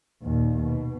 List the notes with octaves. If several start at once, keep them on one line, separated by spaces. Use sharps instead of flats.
D#2 A#2
B2